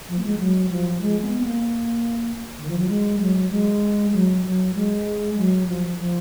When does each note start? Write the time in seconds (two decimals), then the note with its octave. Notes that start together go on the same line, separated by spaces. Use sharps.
0.08 F3
0.19 A#3
0.24 G#3
0.39 F#3
0.70 F3
1.01 G#3
1.22 B3
1.43 A#3
2.59 D#3
2.68 F3
2.78 F#3
2.88 G#3
3.19 F#3
3.51 G#3
4.12 F#3
4.44 F#3
4.75 G#3
5.37 F#3
5.68 F3
5.99 F3